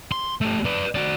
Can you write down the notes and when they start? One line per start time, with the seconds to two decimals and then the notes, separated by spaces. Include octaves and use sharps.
0.12 C6
0.41 A3 G4
0.65 B4 D5
0.95 F#4 D5